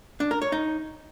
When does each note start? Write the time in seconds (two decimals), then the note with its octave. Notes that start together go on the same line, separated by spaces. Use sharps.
0.20 D4
0.31 A#4
0.42 C#5
0.52 D#4